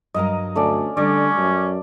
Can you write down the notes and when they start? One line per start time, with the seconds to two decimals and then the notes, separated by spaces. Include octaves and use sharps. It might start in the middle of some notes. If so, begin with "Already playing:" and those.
0.14 G2 F#3 A#4 D#5 F5 A#5
0.56 D2 A3 C#4 D5
0.97 D3 G3 A3 C#4 D5
1.38 F#2